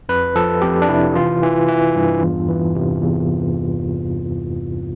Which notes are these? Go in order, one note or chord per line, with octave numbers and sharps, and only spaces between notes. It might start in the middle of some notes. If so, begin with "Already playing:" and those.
F2 B4
F3 A4
F2 G4
D4
C3 E4
E3 F4
E3
E3
G2
E2
E3
C3
E2